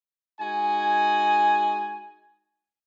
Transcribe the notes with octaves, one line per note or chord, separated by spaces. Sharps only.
G#3 D#4 F#4 G#5